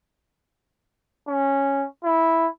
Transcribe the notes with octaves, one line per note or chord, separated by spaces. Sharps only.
C#4
E4